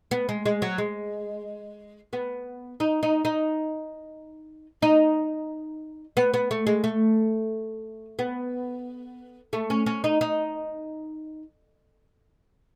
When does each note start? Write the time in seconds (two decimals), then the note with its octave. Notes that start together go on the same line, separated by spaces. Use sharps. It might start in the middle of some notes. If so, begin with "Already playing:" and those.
0.11 B3
0.29 G#3
0.46 G#3
0.62 F#3
0.78 G#3
2.13 B3
2.80 D#4
3.03 D#4
3.25 D#4
4.82 D#4
6.17 B3
6.34 B3
6.51 A3
6.67 G#3
6.84 A3
8.19 B3
9.53 A3
9.70 C#4
9.86 C#4
10.04 D#4
10.21 D#4